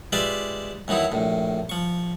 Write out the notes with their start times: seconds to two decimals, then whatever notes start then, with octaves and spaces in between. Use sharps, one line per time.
0.12 G#3 F4 G4 B4 D5 E5
0.88 D#2 E3 F#3 D#4 E4
1.12 A#1 A2
1.69 F3 C#6